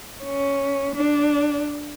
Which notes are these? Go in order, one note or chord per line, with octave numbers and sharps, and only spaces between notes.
C#4
D4